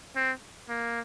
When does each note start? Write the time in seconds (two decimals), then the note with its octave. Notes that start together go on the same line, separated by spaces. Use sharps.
0.16 C4
0.69 A#3